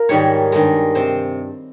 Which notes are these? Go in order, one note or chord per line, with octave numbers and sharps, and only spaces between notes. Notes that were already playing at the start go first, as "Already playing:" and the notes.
Already playing: F4 A#4
G#2 D#3 G3 C#5
G2 D#3 G#3
C3 C5